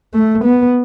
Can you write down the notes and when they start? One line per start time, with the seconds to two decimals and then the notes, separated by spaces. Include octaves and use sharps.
0.14 A3
0.44 B3